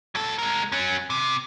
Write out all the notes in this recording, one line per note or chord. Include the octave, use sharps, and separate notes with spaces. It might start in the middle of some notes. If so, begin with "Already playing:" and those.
F#3 A4
G#3 A#4
F#3 C#4
C3